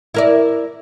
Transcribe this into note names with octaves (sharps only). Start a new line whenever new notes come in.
E4 A#4 D5